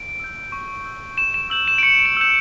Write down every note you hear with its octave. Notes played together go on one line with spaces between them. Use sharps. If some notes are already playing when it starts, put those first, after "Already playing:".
Already playing: D7
E6 G6
C#6
E6 G6
C#6 E7
E7
E6 G6 F#7
E7
D7
C#6 C#7
E7
E6 G6 E7